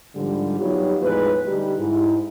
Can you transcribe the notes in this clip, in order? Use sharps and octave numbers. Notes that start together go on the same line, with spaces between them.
G#2 D3 F3 G3
F#3 G3 B3 D#4 F4 G4
E2 A2 F3 G#3 D#4 B4
D3 G3 D#4 G4
G#2 E4